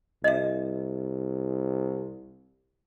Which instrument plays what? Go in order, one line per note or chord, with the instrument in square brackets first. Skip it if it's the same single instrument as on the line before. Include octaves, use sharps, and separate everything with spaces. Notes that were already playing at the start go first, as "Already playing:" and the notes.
[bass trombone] C2 [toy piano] D#5 E5